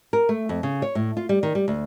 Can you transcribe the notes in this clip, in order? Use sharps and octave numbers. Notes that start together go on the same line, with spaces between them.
A#4
A3
F2
C#3
C#5
A2
F4
G3
D#3
G3
D2